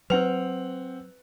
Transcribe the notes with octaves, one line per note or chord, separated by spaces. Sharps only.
F#3 C4 B4 F#5 F7